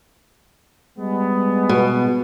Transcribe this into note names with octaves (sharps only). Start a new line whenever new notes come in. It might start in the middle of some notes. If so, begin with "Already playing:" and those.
G3 G#3 B3
B2